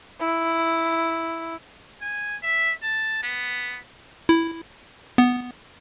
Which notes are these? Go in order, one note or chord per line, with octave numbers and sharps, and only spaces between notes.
E4
G#5
E5
A5
B3
E4
B3